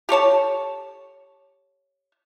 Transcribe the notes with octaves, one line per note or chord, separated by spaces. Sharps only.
G4 A4 C#5 A5